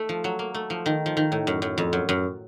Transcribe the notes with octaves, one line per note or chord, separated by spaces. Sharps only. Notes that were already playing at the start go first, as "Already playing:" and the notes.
Already playing: A3
F3
F#3
A#3
A3
F3
D#3
F3
D#3
A2
F#2
F#2
F2
F#2
F#2